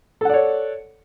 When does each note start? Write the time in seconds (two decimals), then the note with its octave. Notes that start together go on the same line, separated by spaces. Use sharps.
0.21 A4
0.25 F#5
0.29 D5
0.34 C#5